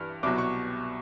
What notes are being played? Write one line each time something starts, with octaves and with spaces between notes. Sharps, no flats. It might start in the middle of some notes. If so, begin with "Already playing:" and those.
Already playing: G2 E3 F6
C2 B2 F#3 D6
C#6